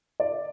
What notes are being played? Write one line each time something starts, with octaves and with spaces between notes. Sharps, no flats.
D5